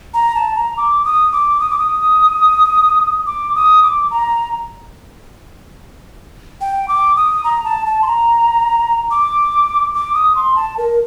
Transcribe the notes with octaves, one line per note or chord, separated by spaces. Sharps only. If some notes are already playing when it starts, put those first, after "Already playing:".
A#5
A5
A#5
D6
D#6
D6
D#6
D6
D#6
D6
D#6
D6
A#5
G5
D6
D#6
A#5
A5
A5
C6
A#5
D6
D6
D#6
C6
A5
A#4